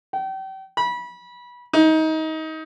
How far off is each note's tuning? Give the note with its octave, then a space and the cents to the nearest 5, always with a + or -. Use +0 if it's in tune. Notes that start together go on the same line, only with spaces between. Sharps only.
G5 -35
B5 -25
D#4 +25